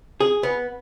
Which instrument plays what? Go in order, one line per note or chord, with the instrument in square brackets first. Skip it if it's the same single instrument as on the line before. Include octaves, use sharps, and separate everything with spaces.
[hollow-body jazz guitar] G#4
B3